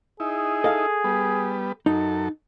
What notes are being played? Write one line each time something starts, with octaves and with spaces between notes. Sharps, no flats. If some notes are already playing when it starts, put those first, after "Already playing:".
D#4 E4 G#4
A4 D#5 F5
G3 B3
F#2 D#4 A4